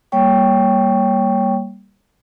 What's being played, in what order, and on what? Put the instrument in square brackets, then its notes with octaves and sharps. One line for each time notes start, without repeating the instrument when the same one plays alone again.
[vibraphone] G3 A#3 C#5 G5 C#6